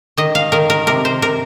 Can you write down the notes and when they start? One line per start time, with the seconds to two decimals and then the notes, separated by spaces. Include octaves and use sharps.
0.17 D#3 D#5
0.35 F5
0.52 D#3 A#4
0.70 A#4
0.87 C3 A#4
1.05 C5
1.22 C3 A#4